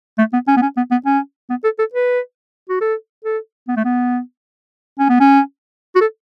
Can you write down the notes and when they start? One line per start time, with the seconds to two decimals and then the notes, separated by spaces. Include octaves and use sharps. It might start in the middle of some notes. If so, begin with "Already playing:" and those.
0.18 A3
0.33 B3
0.48 C#4
0.57 B3
0.62 C#4
0.77 B3
0.91 B3
1.06 C#4
1.50 B3
1.64 A4
1.79 A4
1.94 B4
2.69 F#4
2.81 A4
3.24 A4
3.68 B3
3.76 A3
3.85 B3
4.99 C#4
5.09 B3
5.20 C#4
5.96 F#4
6.01 A4